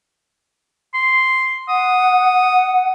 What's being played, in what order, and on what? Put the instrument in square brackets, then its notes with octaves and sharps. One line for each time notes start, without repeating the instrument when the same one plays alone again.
[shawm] C6
[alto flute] F#5 [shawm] D#6